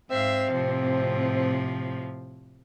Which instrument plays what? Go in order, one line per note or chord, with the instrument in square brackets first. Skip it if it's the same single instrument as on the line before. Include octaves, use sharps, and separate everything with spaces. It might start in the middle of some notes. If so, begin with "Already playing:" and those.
[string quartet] G#2 E5 F5 [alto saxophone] C4
[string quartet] A2 C3 F3